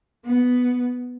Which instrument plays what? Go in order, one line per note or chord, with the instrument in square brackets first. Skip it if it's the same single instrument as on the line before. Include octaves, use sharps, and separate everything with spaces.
[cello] B3